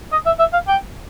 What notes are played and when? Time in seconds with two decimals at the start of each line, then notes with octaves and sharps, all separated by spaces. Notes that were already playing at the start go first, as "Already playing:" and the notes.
0.12 D#5
0.26 E5
0.39 E5
0.53 F5
0.68 G5